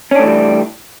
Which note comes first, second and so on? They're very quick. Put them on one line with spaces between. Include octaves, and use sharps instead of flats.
C#4 D4 A3 E3 G3